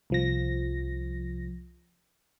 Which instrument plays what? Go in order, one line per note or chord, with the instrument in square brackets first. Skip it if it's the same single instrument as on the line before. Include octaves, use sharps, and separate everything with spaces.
[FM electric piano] C2 F3 A#6